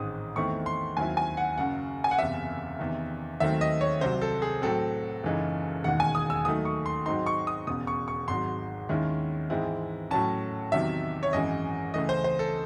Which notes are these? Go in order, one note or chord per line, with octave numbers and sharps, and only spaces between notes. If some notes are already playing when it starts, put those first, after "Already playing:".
Already playing: A1 G#2 D#3 G#3 C4 D#6
E2 D#3 A3 C4 E4 C#6
C6
D#2 D#3 F#3 C4 E4 G#5
G#5
F#5
F#1 F#2 C#3 F#5
G#5
F#5
F#1 E2 C3 E5
E2 C3 D#3
D#2 D#3 F#3 A3 C4 E5
D#5
C#5
C2 C3 F#3 C5
A4
G#4
A2 F#3 C4 A4
F#1 F#2 E3 G#3 D#4
E1 D#2 D#3 G#3 F#5
G#5
D#6
E6
D#2 D#3 F#3 A3 D#4 D#6
C#6
C6
G#2 F#3 C4 D#4 C6
C#6
D#6
E1 E2 C#3 D#6
C#6
C#6
G#1 G#2 F#3 C6
D#2 D#3 G#3 C#4 E4
G#2 E3 G#3 C4 E4
A2 F#3 C#4 A5
E2 C3 D#3 F#3 E5
C#5
G#1 F#2 E3 G#3 D#5
C#2 C#3 E3 A3 D#5
C5
C5
A4